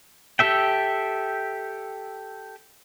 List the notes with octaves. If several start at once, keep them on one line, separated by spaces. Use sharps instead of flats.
G4 A4 E5 G5